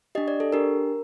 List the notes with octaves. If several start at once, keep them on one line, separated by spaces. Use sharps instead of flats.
D4 G4 D#5
D5
A4
D4 G4 A#4